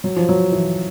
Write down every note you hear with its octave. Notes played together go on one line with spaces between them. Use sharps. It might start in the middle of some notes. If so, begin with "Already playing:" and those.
F#3
F3
F#3
E3